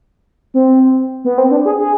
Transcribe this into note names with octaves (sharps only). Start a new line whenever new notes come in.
C4
B3
C4
D4
G#4
G#4